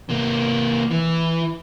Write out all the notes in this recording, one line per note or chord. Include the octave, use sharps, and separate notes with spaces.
C3 A#3
E3